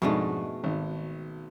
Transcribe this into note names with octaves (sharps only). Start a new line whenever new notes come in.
F2 G#2 B2 G#3 A3 D4
G#1